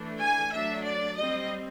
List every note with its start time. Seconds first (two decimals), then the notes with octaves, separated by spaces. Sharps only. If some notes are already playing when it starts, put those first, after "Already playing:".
Already playing: E3 A3 D4
0.21 G#5
0.53 F#3 A3 D4 E5
0.85 D5
1.16 G3 C4 D#5